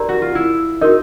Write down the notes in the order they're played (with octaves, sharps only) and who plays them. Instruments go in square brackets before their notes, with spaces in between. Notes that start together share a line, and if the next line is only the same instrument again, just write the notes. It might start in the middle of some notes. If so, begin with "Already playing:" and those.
Already playing: [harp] D#4 [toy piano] G4 A#4 D5 A#5
[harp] F#4
F4
E4
[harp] D#4 [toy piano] F#4 A#4 D#5